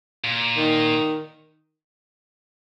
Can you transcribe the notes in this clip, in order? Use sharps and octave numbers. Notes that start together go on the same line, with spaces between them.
A#2
D#3